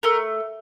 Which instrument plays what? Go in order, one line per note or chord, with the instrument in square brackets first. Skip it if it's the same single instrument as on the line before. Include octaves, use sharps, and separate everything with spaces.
[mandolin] A3 A#4